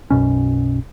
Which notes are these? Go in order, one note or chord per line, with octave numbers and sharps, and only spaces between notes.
B1 F#2 B2 C#4